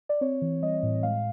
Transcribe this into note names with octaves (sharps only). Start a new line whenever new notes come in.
D5
C4 C#5
E3
G3 D#5
A2
G#3 F5